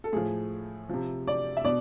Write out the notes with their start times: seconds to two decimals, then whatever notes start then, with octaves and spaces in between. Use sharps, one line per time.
0.04 A4
0.13 A2 F3 G#4
0.89 C3 F3
1.28 D5
1.57 E5
1.65 B2 D5